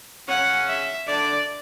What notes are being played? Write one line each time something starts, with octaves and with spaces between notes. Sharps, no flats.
C#3 C#4 F#5
E5
D3 D4 D5